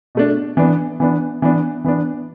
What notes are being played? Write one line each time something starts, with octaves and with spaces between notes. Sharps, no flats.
B2 A3 D4
E3 B3 D4
E3 B3 D4
E3 B3 D4
E3 B3 D4